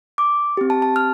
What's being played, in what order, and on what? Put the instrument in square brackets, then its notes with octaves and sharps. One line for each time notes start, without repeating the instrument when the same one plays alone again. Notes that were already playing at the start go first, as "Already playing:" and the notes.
[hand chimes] D6
C4 G4
A5
A5
F6